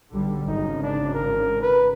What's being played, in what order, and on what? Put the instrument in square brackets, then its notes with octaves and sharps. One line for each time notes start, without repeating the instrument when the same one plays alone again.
[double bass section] B1 D3 G3
[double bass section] G#1 C#3 [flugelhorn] D#4
[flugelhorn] D4
A#4
B4